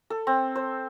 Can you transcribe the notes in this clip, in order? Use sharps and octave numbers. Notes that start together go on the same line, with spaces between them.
A4
C4
C5